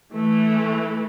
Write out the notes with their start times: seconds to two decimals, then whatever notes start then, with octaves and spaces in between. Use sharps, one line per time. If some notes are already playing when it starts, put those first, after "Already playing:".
0.12 E3 A3